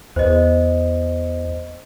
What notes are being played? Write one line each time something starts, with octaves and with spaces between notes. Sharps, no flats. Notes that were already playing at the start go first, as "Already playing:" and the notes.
E2 C5 D#5